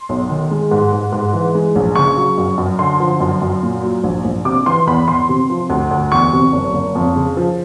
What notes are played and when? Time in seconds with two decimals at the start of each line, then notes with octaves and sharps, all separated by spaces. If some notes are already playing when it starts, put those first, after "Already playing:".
Already playing: C6
0.09 B1
0.29 D#3
0.51 G#3
0.71 G#2
0.92 G#2
1.12 G#2
1.33 E3
1.55 G#3
1.75 A#1
1.95 C#3 C#6
2.17 F#3
2.38 F#2
2.58 F#2
2.79 D3 C6
3.00 F3
3.20 F#2
3.42 F#2
3.63 A#2
3.83 F#3
4.04 A#1
4.25 A#1
4.45 C3 D6
4.66 E3 C6
4.87 E2 B5
5.08 E2 C6
5.29 C3
5.50 F3
5.70 D2
5.91 D2
6.12 E2 C#6
6.33 C3
6.53 F#1
6.73 F#1
6.95 F2
7.16 C#3
7.37 F3